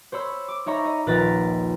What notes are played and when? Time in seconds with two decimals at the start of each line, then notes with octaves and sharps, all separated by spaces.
0.12 C5 C#5 B5 E6
0.48 D6
0.66 D#4 C#5 E5 A#5 B5 C#6
0.85 D#5
1.06 D#1 A#1 B4 A#5 A6 B6